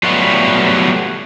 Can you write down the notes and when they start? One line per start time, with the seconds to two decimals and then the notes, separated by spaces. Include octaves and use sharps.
0.03 F#3 G3 A3 B3 F4 F#4